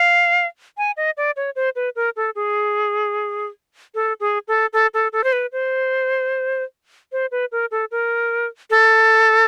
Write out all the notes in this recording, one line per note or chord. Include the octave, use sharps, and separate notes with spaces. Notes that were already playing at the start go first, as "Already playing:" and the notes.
Already playing: F5
G#5
D#5
D5
C#5
C5
B4
A#4
A4
G#4
A4
G#4
A4
A4
A4
A4
C5
B4
C5
C5
B4
A#4
A4
A#4
A4